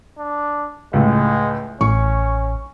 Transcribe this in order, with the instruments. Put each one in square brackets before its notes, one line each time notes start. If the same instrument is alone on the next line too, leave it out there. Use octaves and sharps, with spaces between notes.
[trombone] D4
[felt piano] C#2 A2 [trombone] G#3
[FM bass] A1 [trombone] C#4 [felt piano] C#6